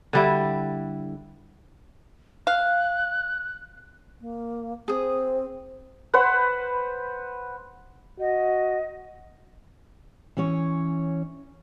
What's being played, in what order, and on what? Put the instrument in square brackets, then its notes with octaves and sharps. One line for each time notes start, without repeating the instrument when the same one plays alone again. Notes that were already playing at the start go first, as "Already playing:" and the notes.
[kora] D3 G3 E4
[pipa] F5 [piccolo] F#6
[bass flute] A#3
[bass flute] C4 [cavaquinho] G#4 D#6
[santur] B4 C5 F#5
[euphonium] F#4 [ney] D#5
[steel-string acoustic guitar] E3 C#4 C#5